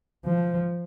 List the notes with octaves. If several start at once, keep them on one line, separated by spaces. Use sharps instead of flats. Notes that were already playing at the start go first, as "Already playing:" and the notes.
F3